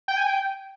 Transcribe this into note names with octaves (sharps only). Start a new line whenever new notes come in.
G5
G#5
G5